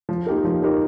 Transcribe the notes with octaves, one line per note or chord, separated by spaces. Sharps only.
F3
A#3 D#4 G4 A#4
F3
A#3 D#4 G4 A#4